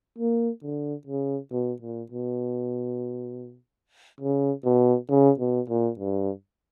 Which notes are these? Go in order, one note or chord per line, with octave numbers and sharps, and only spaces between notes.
A#3
D3
C#3
B2
A#2
B2
C#3
B2
C#3
B2
A#2
G2